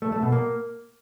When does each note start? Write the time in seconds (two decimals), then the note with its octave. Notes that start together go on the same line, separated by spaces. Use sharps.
0.02 A3
0.12 A3
0.22 B2
0.32 A#3